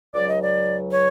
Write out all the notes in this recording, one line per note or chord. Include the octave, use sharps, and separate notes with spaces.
C#2 C#3 F#3 D5
D#5
D5
C#5